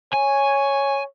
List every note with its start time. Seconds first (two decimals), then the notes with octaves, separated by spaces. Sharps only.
0.14 C#5 G#5